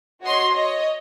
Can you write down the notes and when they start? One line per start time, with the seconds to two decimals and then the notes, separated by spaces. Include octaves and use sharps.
0.22 F#4 C#5 D#5 C6
0.54 C#5 D#5